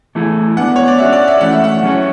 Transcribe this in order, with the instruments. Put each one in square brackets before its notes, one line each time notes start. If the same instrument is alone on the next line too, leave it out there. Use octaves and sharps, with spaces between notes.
[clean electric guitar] E3 A3 E4 G#4
[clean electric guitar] G#3 B3 D4 [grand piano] F#5
[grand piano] C#5
D5
[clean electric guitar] G#3 C#4 F#4 [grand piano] E5
[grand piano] D5
E5
[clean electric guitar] E3 A3 C#4 E4 [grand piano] F#5
[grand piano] E5
F#5
[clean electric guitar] F#3 C#4 G#4 C#5